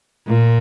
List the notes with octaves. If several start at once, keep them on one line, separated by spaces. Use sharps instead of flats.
A#2